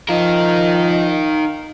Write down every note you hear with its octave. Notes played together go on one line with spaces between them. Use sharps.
F3 D#4 A#4 D#5 F5